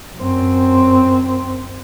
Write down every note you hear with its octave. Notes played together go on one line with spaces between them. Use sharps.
F#2 C4